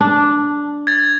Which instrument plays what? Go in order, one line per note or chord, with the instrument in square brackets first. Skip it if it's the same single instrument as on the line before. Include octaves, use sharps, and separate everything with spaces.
[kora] D4
[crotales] G#6 A6